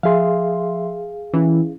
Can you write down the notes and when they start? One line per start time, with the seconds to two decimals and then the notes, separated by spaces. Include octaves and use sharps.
0.03 F3 G#4 E5 F5 C6
1.34 E3 C#4 E4